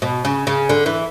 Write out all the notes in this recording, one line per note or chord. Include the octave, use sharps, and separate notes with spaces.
B2
C#3
C#3
D3
E3